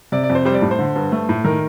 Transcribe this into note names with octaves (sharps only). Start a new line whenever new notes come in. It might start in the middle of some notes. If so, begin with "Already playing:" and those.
C3 D5
D5
F2
C5
G3 C5
D5
A2
C5
D3
G2
A3
A2
D#3 A#4